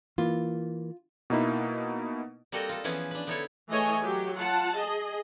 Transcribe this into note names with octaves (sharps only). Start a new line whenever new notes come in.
E3 A#3 F4
B2 A#3 D#4 E4
G3 A#3 C4 F#4 A4 D#5
F4 A4
E3 F3 B3 C#4 G#4 B4
D4 B4
D3 B3 D#4 E4 A4 C#5
E3 A3 G#4 C#5 D#5 G#5
F#3 G4
F4 F#5 A5
G#4 D#5